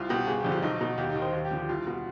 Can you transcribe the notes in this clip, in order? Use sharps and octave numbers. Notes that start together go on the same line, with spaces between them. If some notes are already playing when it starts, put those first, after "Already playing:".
Already playing: C2 F4
B2 G4
G1 G#4
G4
F2 D3 F3
F4
B1 D#4
B2 D#4
D#2 G4
D#4
D#3
C5
D#2
G4
D3 F3
G4
C2 F4
B2